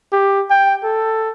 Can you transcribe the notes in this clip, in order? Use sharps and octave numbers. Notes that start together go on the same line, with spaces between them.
G4
G5
A4